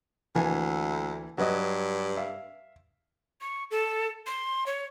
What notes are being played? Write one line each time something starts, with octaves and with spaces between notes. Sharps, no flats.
D2 E3 A#3 G#5
G2 F#3 B4 D#5
E5 F5
C#6
A4
C6
C#5